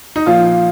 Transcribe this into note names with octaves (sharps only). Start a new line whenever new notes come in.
D#4
A#2 F3 F4